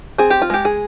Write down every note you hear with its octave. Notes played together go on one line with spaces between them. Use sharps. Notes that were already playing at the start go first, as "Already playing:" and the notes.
C4 G#4
G4
F4
G#3 G4
G#4